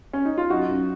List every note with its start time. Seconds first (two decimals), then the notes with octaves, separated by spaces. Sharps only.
0.13 C#4
0.25 D#4
0.38 F4
0.50 F#2 D#4 F#4
0.69 F#2